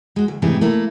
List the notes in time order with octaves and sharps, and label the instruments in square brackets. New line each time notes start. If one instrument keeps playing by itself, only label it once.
[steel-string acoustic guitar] G#3 F#4
D2
G#2 C3 E3 A3 G4 G#4
A3 A#3 E4